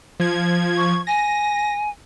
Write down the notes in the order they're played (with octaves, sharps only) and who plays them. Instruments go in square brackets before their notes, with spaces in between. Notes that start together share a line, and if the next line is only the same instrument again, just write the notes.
[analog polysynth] F3 G#6
[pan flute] C#6
[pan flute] G#5 [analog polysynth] A#6